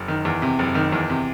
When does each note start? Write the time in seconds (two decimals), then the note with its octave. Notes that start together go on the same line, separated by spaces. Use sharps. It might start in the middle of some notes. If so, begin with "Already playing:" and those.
Already playing: F#1
0.08 D#3
0.25 E2
0.42 C3
0.59 F#1
0.75 D#3
0.92 E2
1.10 C3